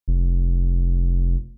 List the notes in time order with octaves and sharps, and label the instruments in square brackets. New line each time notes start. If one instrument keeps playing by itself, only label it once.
[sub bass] F1